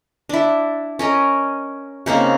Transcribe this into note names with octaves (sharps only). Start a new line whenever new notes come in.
D4 E4
C#4 A#4 D#5
C#3 A#3 C4 D#4